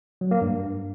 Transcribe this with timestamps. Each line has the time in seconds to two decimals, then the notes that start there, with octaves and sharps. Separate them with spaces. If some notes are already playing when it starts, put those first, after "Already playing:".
0.21 F#3
0.31 A#3
0.41 G2